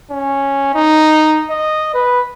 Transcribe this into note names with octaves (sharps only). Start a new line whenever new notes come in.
C#4
D#4
D#5
B4